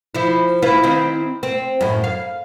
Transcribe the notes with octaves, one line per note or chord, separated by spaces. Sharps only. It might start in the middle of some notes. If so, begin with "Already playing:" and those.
F3 E4
E4 F4 B4
D#3 C4 E4
C4
F#2 A2
F5